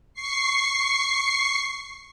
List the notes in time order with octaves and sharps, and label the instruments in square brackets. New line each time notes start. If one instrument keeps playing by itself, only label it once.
[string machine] C#6 C7